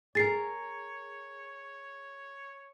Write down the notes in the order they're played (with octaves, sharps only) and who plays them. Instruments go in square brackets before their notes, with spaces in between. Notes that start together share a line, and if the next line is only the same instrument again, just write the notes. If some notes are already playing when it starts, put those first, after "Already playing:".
[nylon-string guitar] G#4 A#4 [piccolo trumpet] C#5 [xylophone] A6 C7